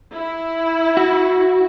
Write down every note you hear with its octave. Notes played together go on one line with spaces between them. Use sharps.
E4
F#4